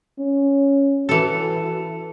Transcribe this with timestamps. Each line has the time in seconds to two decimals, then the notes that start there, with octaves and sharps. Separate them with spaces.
0.19 C#4
1.09 E3 F#4 A4